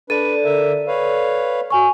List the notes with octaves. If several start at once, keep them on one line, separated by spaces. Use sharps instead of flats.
D4 A4 B4 D5 D#7
D3 A#4 E5
B4 C#5 F5
F#4 G#5 C#6